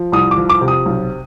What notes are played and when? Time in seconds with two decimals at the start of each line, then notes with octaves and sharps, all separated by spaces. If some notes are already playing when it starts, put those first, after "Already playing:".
Already playing: F3
0.12 C2 D#6
0.31 D6
0.37 F3
0.49 D6
0.61 C3
0.68 D#6
0.86 B1